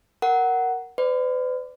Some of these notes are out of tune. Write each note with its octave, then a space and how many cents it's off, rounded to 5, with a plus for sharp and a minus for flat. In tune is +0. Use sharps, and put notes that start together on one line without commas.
A#4 +0 F#5 +10
B4 +45 D5 +0